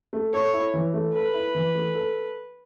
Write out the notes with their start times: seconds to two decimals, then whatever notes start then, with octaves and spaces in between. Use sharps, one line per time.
0.13 A3
0.33 A4 C#5
0.53 E4
0.74 E3
0.94 A3
1.14 A4 B4
1.34 E4
1.55 E3
1.75 A3
1.95 A4